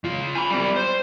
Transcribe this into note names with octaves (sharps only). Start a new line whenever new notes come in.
C#3 F4
G#5 B5
G3 C4
C5